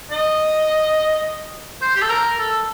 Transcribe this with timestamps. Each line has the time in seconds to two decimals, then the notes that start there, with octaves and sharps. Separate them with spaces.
0.11 D#5
1.81 C5
1.95 G4
2.02 A4
2.10 A#4
2.38 A4